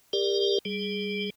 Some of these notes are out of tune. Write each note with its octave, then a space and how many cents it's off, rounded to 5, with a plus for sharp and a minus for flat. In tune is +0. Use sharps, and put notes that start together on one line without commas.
G4 +30 A#4 +0 D5 +0
G3 +0 G#4 +0